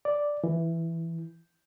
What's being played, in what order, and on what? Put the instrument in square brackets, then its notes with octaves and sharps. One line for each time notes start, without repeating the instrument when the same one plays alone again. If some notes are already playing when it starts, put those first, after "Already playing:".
[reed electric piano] D5
E3